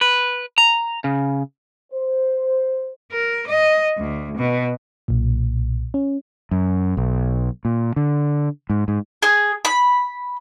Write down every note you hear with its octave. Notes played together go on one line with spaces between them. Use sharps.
B4
A#5
C#3
C5
A#4
D#5
D2
B2
B1 A#2
C#4
F#2
B1
A#2
D3
G#2
G#2
G#4
B5